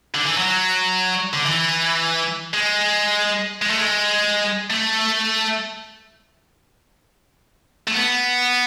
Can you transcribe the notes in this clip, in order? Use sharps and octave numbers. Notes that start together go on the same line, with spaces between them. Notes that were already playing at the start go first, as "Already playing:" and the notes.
D3
E3
F#3
D3
E3
G#3
G#3
A3
G#3
A3
A3
B3